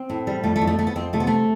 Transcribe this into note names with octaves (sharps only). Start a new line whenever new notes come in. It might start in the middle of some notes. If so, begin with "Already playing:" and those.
Already playing: C4
A2
G3
F2 A3
A3
F2
A3
F2 A3
B3
F2 C4
C3 A3
B3
A3